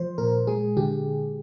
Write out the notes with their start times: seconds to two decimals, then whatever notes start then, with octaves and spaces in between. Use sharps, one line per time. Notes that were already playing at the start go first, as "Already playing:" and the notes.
Already playing: F3 C5
0.18 A#2 A#4
0.47 G#3 G#4
0.77 D3 G4